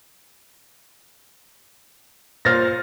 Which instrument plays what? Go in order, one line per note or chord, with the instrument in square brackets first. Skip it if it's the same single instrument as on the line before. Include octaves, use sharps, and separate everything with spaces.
[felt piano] A#2 C5 [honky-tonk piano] F6 A6 A#6